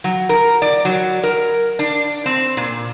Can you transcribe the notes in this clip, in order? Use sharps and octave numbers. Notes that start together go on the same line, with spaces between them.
F#3
A#4
D5
F#3
A#4
D4
C4
A#2